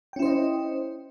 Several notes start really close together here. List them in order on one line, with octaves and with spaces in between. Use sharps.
G5 C#4 E4 C5 D#5